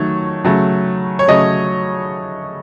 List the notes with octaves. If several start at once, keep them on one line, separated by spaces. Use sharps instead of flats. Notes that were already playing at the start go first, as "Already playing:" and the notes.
Already playing: D#3 F#3 A3 C#5
C#3 F#3 A3
C#5
C#3 F#3 A3 D#5